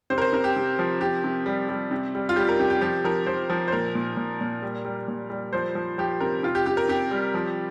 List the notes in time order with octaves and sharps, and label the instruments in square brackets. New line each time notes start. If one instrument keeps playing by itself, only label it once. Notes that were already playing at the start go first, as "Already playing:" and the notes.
[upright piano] C3 C5
A#4
C5
C3 A#4
G4
C3
F3
C3 G4
C3
G3
G3
C3
G3
F4
G3 G4
A#4
C3 G4
G4
F3 G4
F3 A#4
F3 C5
F3
C5
A#2 A#4
A#2
A#2
A#2
G3
G3
A#2
G3
F3 C5
F3
F3 G4
C3 A#4
C3 F4
G4
C3 G4
A#4
C3 G4
G3
F3